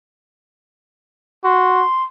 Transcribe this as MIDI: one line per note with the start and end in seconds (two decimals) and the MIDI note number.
1.44 1.84 66
1.44 2.03 84